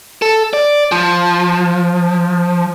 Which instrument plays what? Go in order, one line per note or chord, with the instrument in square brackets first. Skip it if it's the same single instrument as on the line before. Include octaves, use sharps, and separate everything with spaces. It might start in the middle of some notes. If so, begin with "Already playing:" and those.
[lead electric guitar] A4
D5
F3